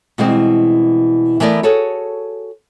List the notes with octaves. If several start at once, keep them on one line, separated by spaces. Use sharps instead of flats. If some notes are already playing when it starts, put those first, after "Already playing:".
B2 E3 G3 G#3 C4
E3 A3 B3 A#4 D5
F#4 G#4 A4 C#5